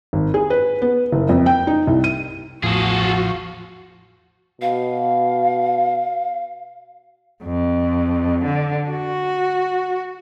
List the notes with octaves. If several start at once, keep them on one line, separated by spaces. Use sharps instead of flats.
G#1
G#4
B4
B3
F#1
F2
G5
D#4
C2
D#7
A1 E2 A2 F3 F#4 G#4 A4
B2 F5
F2
D3
F#4